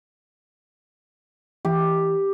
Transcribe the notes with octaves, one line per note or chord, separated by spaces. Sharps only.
E3 G4